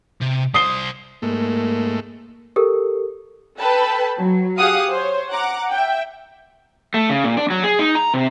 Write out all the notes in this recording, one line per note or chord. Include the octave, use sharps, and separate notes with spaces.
C3
G3 C5 D#6 C7 G7
G#2 A3 A#3
G4 A4 A#4
A4 B4 G5 A5 B5
F#3
G4 G#4 F5 F#5 D#6
C5 C#5
F#5 A#5 D6
E5 G5
A3
C#3
A#2
D4
F#3
G#4
D#4
A#5
C3